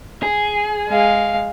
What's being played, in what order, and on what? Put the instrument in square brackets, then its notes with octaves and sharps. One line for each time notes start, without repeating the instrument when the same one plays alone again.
[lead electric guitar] G#4
[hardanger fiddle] G#3 F5